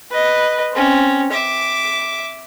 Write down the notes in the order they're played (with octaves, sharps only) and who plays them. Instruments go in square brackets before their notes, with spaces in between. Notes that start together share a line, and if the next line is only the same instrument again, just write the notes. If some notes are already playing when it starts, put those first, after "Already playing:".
[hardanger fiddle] B4 D#5
C4 C#4
E5 D6